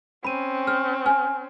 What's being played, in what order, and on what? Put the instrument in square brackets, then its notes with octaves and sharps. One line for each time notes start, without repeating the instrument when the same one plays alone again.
[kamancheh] C4 C#4 [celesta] B5 D#7
[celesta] F6
G#5 F6